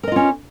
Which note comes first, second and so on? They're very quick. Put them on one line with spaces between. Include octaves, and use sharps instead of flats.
A#4 D#5 F4 C#4